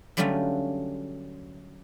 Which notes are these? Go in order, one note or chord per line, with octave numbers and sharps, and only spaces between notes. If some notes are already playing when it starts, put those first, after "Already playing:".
D3 F#3 G3 A3 C#4 F4